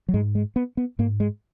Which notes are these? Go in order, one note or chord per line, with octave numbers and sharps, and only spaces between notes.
F#3
G#2 G#3
G#3
B3
B3
G#2 A#3
G#3